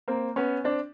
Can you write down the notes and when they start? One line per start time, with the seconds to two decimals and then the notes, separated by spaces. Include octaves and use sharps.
0.08 A#3 C4
0.36 B3 C#4
0.64 C4 D4